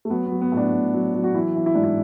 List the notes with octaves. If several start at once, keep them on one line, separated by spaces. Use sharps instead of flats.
A3
F#3 B3
F#3 B3
B3
A2
D4
A2
F#3
F#3
F#4
E3 E4
E3
E4
G#2 D4
E4